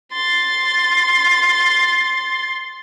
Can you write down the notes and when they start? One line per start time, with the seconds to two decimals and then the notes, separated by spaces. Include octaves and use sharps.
0.12 C6 A6